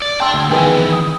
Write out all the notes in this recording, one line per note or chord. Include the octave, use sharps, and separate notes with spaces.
D5
D5 G5 A5 C6 E6
D2
D#3 E3 B3 G#4 G5
D#6